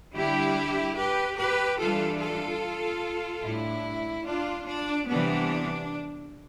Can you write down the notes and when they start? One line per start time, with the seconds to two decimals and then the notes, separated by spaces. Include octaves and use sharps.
0.14 D3 G3 D4 E4 G4
0.97 G4 B4
1.37 G4 B4
1.79 E3 G3 D4 F4 A4
2.20 F4 A4
3.44 A2 G3 D4 E4
4.25 D4 F4
4.67 D4
5.08 C3 E3 G3 B3 D4